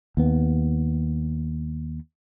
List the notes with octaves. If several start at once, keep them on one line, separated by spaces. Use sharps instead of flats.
D#2 B3